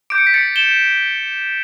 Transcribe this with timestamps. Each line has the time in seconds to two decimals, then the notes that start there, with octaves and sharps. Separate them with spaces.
0.10 D6 G6 D7
0.18 C#7
0.27 B6
0.34 A6 C#7
0.56 E7 G7